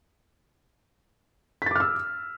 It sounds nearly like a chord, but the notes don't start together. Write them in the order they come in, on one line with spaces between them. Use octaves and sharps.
B6 A6 D6 F6 E6